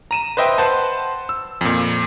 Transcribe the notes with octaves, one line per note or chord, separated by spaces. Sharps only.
A#5 D#7 E7
B4 C5 D#5 E5 G5
B4 C5 F#5 A5 C6
E6
F2 A#2